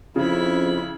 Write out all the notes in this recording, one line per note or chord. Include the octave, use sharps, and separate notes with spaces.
F2 C#3 E4 B5